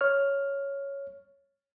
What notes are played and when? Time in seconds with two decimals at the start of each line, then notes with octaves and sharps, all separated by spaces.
0.01 C#5 F6